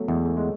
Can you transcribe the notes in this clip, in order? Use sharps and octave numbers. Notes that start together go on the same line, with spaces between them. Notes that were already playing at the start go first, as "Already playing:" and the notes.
Already playing: F#3 A3 B3
E2 G#3
A3
G#3